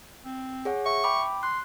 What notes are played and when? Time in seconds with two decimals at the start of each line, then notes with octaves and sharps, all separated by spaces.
0.25 C4
0.65 G#4 C#5 F#5
0.86 E5 C#6
1.04 G5 B5 D6
1.43 C6 F#6